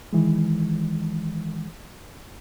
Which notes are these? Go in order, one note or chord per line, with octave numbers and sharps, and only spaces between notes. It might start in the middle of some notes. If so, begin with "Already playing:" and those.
D#3 E3 G#3